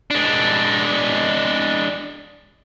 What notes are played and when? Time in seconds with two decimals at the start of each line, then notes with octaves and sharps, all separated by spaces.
0.11 G#3 D4